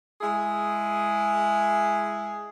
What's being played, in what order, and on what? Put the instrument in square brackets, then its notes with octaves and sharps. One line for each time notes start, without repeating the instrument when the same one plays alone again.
[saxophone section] G#3 E4 G#4